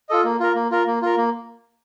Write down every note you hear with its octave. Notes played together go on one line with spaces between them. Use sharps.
F4 A4 D#5
A#3
F4 A#4
A#3
F4 A#4
A#3
F4 A#4
A#3